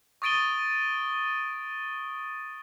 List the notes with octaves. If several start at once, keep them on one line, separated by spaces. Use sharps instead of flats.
C#6 D#6 A6 D7 D#7 G7